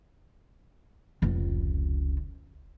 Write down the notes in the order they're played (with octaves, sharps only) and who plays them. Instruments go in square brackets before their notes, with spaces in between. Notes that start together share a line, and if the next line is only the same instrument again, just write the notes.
[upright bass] F1 C#2